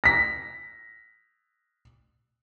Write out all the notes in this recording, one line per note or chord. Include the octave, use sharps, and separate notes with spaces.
A#6 B6